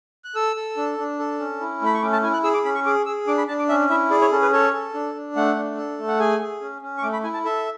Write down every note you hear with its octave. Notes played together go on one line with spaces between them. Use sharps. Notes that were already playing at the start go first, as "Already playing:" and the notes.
F#6
A4 E6
A4
D4
D4
A4
C#4
E4
A3 B5
C#6
C#4 D6
A5
E4 G#5
F#6
G#4 E6
D6
C#4 B5
C#6
G#4 D6
G#4 E6
D4 D6
B5
D4 A5
D6
C#4 E5
E4 E5
G#4 D5
C#5
C#4 A4
B4
A4 C#5
A4
D4
D4
A3 F#5
D4
A4
A3
F#5
G#4 G#5
G#4
C#4
C#4
C#6
A3 D6
B5
E4 G#5
A5
A4 E5